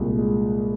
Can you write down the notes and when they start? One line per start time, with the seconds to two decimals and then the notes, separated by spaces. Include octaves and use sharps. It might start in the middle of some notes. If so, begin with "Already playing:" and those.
Already playing: C2 A#2 G#3
0.19 G#3